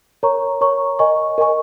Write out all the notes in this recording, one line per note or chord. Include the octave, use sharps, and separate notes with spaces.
A#4 C#5 A#5 C#6
A#4 C#5 A#5 C#6
A#4 D#5 G#5 C#6
A#4 D#5 G#5 C#6